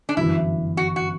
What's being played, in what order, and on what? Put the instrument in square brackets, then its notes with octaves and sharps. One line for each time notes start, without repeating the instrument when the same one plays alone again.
[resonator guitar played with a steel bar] D4
[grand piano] G1 F#2 E3 [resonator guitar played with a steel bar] E4
[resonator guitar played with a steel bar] F#4
F#4